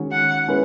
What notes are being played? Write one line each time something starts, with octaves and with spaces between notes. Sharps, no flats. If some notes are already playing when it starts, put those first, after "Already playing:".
Already playing: D#3 G#3 C#4 F#4
F#5
G#3 C#4 E4 B4